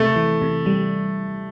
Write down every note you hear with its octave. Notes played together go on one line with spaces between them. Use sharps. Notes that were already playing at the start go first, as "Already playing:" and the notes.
Already playing: C3 A3
E3
C3
G3